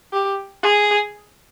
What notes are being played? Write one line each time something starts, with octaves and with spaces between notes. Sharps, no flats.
G4
G#4